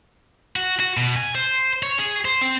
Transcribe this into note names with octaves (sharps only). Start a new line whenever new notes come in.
F#4
F#4
B2
G#5
C5
C#5
G#4
C5
C4